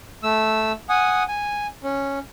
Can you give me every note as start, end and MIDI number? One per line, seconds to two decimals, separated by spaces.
0.23 0.72 57
0.23 0.72 88
0.89 1.23 78
0.89 1.23 80
0.89 1.23 87
1.28 1.67 80
1.83 2.19 61